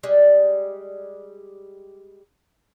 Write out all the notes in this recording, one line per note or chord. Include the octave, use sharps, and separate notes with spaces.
G3 G#3